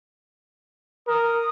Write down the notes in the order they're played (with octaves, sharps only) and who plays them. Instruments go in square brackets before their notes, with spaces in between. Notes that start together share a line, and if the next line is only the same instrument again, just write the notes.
[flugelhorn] A#4 [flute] D#6